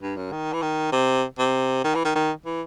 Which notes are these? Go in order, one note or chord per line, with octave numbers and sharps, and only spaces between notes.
G2
F#2
D#3
E3
D#3
C3
C3
D#3
E3
D#3
D#3
E3